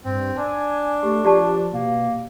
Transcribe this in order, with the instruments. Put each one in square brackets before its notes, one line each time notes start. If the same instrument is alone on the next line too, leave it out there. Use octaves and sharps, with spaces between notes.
[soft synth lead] G2 [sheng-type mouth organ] C4
[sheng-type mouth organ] D4 [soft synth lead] G#5
[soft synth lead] A3 [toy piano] G4
[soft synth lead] F3 [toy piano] G4 D5 A5
[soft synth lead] B2 [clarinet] A#3